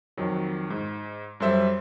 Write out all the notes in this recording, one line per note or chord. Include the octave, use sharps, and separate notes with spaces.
F2 D#3 F#3
G#2
F#2 G3 A4 C5 E5